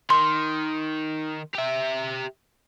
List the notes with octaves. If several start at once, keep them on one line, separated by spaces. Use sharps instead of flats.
D#3 C6
G4 E5